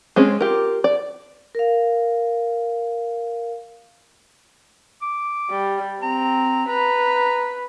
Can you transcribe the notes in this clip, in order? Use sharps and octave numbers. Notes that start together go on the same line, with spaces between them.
G#3 C4 C#4 G#4
F4 G4 A#4
D5
A#4 F5
D6
G3
C4 A#5
B4 A#5